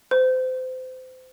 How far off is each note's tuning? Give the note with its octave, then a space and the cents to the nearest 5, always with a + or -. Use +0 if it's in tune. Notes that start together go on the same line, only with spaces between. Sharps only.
C5 -30